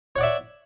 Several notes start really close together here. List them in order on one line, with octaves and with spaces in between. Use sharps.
C#5 F#5 D5 E5